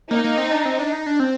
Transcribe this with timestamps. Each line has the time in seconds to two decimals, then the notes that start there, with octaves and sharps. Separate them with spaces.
0.10 A#3 D#4
0.24 A#3
0.38 C4
0.52 D4
0.65 C4
0.79 D4
0.93 D#4
1.06 D4
1.20 C4